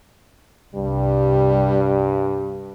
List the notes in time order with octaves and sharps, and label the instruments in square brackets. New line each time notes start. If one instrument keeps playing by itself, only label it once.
[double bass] C2 [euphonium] G2 [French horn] G3